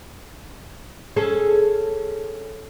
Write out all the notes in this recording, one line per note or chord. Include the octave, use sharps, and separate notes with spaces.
C#4 G#4 A4